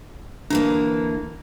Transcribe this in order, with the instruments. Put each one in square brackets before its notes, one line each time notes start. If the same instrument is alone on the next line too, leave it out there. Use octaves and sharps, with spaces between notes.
[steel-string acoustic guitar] D3 E3 A#3 [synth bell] D4